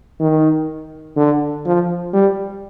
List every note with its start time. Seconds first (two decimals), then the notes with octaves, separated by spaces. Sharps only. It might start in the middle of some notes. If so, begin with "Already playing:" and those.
0.20 D#3
1.16 D3
1.65 F3
2.13 G3